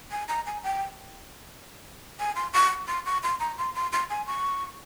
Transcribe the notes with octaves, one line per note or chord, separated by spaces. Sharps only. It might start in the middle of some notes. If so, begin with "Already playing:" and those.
G#5
A#5
G#5
G5
G#5
C6
C#6
C6
C#6
C6
A#5
C6
C6
C6
G#5
C#6